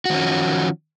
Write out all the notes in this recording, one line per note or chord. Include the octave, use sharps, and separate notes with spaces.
D#3 F3 C#4 F#4